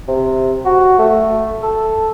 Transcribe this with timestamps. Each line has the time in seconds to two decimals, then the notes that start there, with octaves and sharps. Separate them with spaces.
0.08 C3
0.65 F#4
0.99 A3
1.63 A4